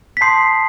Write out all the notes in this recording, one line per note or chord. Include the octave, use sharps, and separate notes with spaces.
B6
A5 C6 D#6 G6 C7